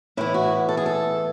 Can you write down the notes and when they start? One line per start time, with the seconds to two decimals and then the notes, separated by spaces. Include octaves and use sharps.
0.17 A2 E3 E4
0.34 F#4
0.69 A4
0.77 G#4
0.86 A4